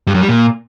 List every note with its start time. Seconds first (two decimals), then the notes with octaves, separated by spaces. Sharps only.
0.07 G2
0.14 F#2
0.21 G3
0.29 A#2